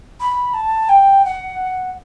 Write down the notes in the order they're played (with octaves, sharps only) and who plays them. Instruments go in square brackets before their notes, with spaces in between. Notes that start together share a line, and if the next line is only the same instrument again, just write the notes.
[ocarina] B5
A5
G5
F#5